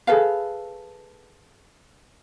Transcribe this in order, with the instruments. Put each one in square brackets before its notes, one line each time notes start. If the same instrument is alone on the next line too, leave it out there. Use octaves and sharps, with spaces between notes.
[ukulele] G#4 A4 B4 F5